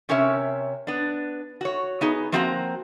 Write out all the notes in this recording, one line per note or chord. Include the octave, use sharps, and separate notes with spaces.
C3 C#4 A#4 C#5 E5
B3 D4
F#4 C#5
B3 D#4 G#4
F3 A#3 C4 F#4 D5 A#5